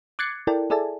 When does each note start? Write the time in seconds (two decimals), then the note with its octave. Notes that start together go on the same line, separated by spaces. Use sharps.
0.19 D6 F#6 G#6 A6 C7 C#7
0.47 E4 A4 A#4 D5 G5 A5
0.70 G#4 A4 D5 E5 G#5 A5